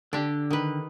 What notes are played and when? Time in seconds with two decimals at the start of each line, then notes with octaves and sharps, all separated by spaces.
0.13 D3 D4 G4
0.50 D#3 B4